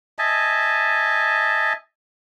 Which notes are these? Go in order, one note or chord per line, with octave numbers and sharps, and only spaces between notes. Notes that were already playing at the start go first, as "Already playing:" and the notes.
D#5 E5 G#5 A5